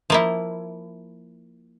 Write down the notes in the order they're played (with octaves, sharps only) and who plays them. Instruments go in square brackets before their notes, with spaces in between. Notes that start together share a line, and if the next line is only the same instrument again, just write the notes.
[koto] F3 A#3 E4